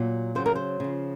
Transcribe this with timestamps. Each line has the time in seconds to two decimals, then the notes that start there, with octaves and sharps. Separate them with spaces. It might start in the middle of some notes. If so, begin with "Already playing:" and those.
Already playing: A#2 F#3
0.35 C#3 F#3 C5
0.46 A#4
0.55 C5
0.80 C#3 F3